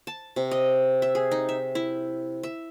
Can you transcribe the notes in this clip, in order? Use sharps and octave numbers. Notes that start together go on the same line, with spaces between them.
A5
C3
D#5
E5
G#4
D#4
E5
E4
E5